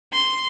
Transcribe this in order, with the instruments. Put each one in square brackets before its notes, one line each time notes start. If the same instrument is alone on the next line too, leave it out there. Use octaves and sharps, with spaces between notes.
[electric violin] C6